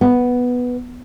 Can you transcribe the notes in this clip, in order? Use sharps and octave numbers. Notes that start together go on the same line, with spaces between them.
B3